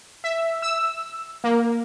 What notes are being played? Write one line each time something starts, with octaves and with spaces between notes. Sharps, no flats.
E5
E6
A#3